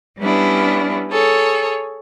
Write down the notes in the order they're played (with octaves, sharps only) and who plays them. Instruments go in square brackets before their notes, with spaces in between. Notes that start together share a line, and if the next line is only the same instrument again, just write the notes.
[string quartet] G3 B3 C#4 D4 E4
G#4 A4 C#5